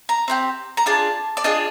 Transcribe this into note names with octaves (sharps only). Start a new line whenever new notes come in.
A#5
C4 D#4 G4
A#5
D4 F4 G#4 A5
D5
D4 F4 G#4 D#5